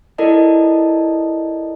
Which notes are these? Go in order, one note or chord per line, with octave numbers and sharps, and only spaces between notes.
E4 A4 A#4 D5 D#5 A5